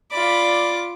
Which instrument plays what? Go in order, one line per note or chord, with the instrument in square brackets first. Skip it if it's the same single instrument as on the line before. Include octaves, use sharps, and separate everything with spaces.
[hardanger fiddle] F4 D6 [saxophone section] D5 [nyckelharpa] B5